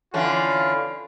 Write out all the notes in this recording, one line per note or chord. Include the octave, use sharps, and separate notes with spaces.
D3 E3 C#4 F4